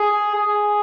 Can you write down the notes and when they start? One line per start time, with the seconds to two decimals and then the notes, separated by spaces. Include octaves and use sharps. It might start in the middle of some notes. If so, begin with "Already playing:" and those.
Already playing: G#4
0.35 G#4